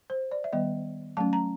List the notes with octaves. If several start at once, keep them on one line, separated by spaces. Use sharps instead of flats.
C5
D5
E5
D#3 G3 B3 D#5
F#3 A3 C#4 A5
A#5